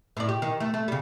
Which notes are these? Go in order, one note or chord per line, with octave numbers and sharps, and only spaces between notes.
A2 D5
G4
D#3
A3
A3
C#3 G3